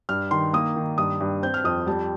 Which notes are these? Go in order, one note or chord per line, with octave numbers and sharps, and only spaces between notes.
G2 F6
D#3 C6
A#3 D#6
D#3
G2 D#6
G2
C4 G6
F6
F2 D#6
G3 A5